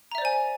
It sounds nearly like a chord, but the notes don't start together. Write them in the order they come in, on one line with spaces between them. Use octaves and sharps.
A#5 E5 D5 C5 G#5